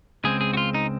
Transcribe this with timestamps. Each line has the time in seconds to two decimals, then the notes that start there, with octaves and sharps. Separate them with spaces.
0.24 C#2 C#3 G#3 C4 G#4
0.41 G#4
0.53 F#4
0.57 F4
0.74 D#4